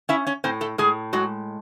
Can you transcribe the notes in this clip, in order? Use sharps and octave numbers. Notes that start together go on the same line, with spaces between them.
C#4 E4 E5
C#4 C#5
A2 C4 C5
A3 A4
A2 G#3 G#4
F#3 G#3 F#4